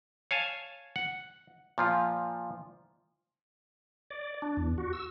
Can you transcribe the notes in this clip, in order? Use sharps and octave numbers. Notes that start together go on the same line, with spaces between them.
C#5 F5 G#5 A5
F#5
A#2 F3 F4
D5
D4
E2
F#4
E6